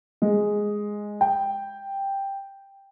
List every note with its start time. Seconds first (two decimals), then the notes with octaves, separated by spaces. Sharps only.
0.22 G#3
1.21 G5